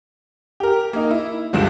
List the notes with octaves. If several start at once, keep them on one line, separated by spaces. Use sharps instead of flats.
G4 A#4
A#3 D#4
E4
G1 C#2 G2 D7 E7